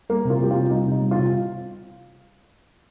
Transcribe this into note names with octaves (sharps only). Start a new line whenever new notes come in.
G3 A#3
C3
F4
G3 G4
C3 F4
G3 D#4
C3
D#4
G3
F4
C3